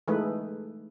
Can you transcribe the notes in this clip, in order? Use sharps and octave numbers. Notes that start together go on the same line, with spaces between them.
E3 G#3 A3 D#4 B4